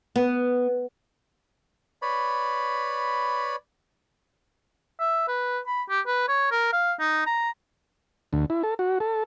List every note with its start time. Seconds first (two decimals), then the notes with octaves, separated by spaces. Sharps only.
0.16 B3
2.02 B4 C#5 D5 B5
5.00 E5
5.28 B4
5.67 B5
5.90 G4
6.07 B4
6.28 C#5
6.51 A#4
6.73 F5
7.00 D#4
7.26 A#5
8.33 D2
8.50 E4
8.63 A4
8.79 F#4
9.00 A4